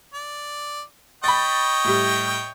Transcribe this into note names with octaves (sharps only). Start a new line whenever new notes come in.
D5
C#5 D#5 G5 B5 A6
A2 G3